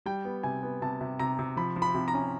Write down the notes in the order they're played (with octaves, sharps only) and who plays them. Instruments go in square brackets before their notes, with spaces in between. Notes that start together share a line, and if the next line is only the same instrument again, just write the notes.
[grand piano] G3 G5
B3
C3 G#5
B3
C3 A5
C3
C3 A#5
C3
F3 B5
F3
B5
C3
A#5
C#4